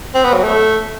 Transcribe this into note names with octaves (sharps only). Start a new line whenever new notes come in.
C4
B3
F#3
A3